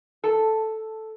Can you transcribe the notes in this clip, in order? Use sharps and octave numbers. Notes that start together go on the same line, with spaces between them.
A4